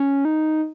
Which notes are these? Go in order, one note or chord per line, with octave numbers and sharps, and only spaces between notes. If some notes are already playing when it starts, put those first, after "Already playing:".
Already playing: C#4
D#4